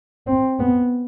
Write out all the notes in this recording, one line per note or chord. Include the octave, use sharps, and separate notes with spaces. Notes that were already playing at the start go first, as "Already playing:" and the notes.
C4
B3